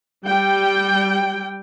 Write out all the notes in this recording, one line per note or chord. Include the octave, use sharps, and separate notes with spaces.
G3 G5